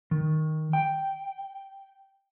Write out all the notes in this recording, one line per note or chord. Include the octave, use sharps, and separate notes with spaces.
D#3
G5